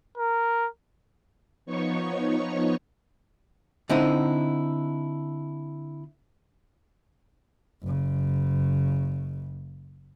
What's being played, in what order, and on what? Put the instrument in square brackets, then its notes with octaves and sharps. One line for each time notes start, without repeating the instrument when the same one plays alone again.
[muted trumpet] A#4
[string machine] F3 B3 D#4 C#5 C#6
[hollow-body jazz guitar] D3 C4 D#4 E4
[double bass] F#1 C#3